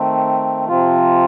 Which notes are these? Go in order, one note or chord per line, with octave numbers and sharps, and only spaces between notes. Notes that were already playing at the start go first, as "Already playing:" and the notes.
Already playing: D#3 A3 C4
C3 F3 C4 F4